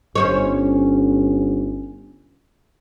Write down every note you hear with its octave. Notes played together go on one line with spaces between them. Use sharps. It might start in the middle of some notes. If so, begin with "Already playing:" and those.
G1 C#4 C5 C#5